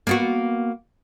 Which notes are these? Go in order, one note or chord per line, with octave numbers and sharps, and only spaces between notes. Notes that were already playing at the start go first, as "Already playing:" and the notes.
A#3 B3 F#4